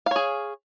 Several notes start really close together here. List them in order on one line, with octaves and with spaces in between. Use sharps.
F5 C#5 G#4